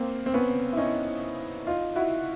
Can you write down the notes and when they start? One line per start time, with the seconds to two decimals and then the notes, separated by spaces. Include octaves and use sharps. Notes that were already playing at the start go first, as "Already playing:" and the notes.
Already playing: A#3 C4
0.26 C4
0.34 B3 C#4
0.73 E4
0.77 C#4 D#4
1.67 D#4 F4
1.95 E4 F#4